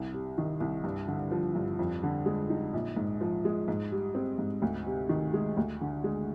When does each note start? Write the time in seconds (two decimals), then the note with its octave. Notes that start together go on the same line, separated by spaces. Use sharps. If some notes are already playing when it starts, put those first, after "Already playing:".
Already playing: C2
0.13 C3
0.38 D#3
0.60 C2
0.84 G2
1.08 D3
1.31 F3
1.55 G2
1.79 F2
2.03 D3
2.26 G#3
2.50 D#4
2.73 A#1
2.96 G#2
3.21 F3
3.45 G#3
3.68 G#2
3.92 G3
4.15 C4
4.38 G#2
4.62 D2
4.86 C3
5.09 D#3
5.34 G#3
5.57 D2
5.81 D3
6.04 G#3